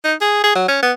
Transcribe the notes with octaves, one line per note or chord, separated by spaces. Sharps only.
D#4
G#4
G#4
F#3
C#4
B3